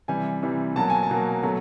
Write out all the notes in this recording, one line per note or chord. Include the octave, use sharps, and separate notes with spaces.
C3 E3 G3 G#5
C3 E3 G3
B2 F#3 A#3 A5
G#5
A5
B2 F#3 A#3
B2 F#3 A3